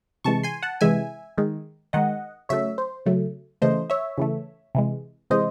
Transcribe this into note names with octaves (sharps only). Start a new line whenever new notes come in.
C3 E3 G#3 A5 C#6
G#5 C6
F#5 A5
C3 E3 G#3 E5 G#5
D#3 G#3
D#3 G#3 D#5 F#5
C#3 F#3 A3 C#5 E5
C5
C#3 F#3 A3
C#3 E3 A3 C5 D#5
C#5 E5
C#3 E3 A3
C3 E3 G#3
C3 E3 G#3 C5 D#5